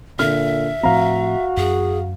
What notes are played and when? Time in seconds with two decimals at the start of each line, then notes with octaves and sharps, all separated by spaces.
0.19 A#2 D3 E5 F6
0.83 A2 F3 C4 F#4 F5 A#5
1.57 F#2 G#4